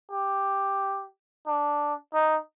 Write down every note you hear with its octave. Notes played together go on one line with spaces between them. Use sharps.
G4
D4
D#4